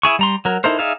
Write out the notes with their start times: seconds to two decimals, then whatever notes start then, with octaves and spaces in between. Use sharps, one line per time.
0.03 E4 G#4 C#6
0.19 G3 A#5 C6
0.45 F#3 A#4
0.64 D#4 E4 A4 A#4 C5
0.79 D#4 G#4 D5 E5 F5